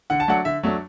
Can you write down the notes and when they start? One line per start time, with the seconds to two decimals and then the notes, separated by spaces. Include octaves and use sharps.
0.10 D3 F#5
0.20 A5
0.28 F#3 A3 D4 F#5
0.45 D3 E5
0.63 F#3 A3 D4